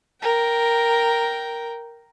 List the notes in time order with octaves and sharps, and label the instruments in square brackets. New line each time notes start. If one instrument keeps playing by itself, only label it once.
[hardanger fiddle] A#4 G5